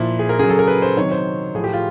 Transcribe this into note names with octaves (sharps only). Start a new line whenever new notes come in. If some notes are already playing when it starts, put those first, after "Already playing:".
Already playing: A#2 F3 E4
G#4
A#4
C#3 F#3 G#4
A4
A#4
B4
C5
C3 D#3 F#3 C#5
C5
A2 F3 G#4
G4
F4